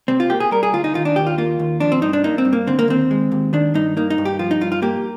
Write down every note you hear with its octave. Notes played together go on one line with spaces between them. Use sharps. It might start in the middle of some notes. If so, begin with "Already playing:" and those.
C3 C4
F4
A#3 G4
G#4
G3 A#4
G#4
D2 F4
D#4
D#3 F4
D4
D#2 G4
F4
A#3 F4
D#2
F3 D4
C4
G2 D#4
D4
A#3 D#4
C4
G2
A#3
D3 C4
A#3
D#2 C4
G#3
D#2
D#3 D4
G2 D#4
A#3 D#4
D#4
G2
G4
F3 F4
D#4
G2 F4
F4
A#3 G4